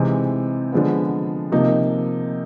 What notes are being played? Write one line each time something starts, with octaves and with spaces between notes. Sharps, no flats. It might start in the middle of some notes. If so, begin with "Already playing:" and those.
Already playing: C3 E3 G#3 C4 D#4
D3 F3 G#3 B3
C3 F3 A#3 D#4